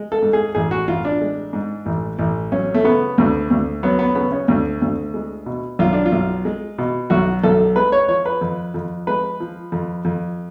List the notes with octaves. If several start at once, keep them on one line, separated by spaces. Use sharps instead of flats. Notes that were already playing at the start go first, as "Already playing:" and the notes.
Already playing: G#3
A4
G#2
G#4
A1 G#4
F#4
A1 F4
D4
G#3
G#2
A1
A1
F#3 C#4
A3
C#3 B3
D2
D2
F#3 B3
B3
C#3 B3
C#4
D2
D2
G#3
B2
B1 F4
D4
F4
B1
G#3
B2
B1 F#4
B1 A4
G#3 B4
C#5
F3 C#5
B4
F2
F2
G#3 B4
F3
F2
F2